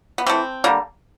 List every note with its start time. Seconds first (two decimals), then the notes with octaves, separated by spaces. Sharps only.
0.18 B3
0.26 E3 A3 C4
0.64 D3 G3 A#3